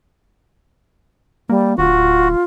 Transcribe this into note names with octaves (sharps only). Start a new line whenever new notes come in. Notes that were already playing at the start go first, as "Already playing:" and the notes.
G3 A#3
D1 F4 F#4